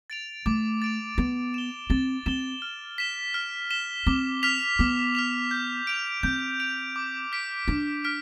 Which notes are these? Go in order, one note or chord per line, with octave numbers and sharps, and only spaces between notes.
A6 D7 F7
A3 D6
A6 D7 F7
B3 A6
E7 G7
C4 A6
C4 E7 G7
F6
B6 E7 G7
F6
B6 E7 G7
C4 D6
F6 B6 F7
B3 D6
F6 B6 F7
G6
D7 F7
C4 G6
D7 F7
D6
F6 B6 D7
D4 D6
F6 B6 D7